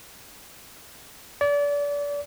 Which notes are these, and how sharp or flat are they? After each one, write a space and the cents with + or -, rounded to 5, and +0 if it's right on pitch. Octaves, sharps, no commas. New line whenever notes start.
D5 -30